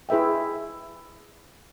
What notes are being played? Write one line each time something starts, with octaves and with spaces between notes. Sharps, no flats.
E4 G#4 B4 E5 G5